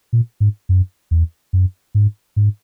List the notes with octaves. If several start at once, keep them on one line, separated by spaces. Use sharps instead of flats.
A#2
G#2
F#2
E2
F#2
G#2
G#2